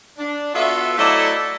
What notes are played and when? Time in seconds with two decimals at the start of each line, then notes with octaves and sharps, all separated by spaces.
0.18 D4
0.53 B3 F4 F#4 A4 E5
0.98 F#3 A3 E4 A4 D5 D#5